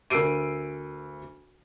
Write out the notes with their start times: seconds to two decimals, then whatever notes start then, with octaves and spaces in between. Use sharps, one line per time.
0.10 D2 A#4 E6 C7 D7 D#7